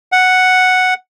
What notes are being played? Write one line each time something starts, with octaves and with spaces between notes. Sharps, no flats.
F#5